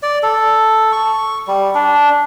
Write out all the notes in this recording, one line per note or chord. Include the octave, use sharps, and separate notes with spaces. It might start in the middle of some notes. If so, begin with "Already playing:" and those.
D5
A4
C#6
G3
D4